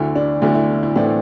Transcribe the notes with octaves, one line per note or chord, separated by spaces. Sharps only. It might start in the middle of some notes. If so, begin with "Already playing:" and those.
Already playing: D2 D3 A3 E4
D4
D2 D3 A3 E4
E4
E4
A2 E3 A3 C4 D4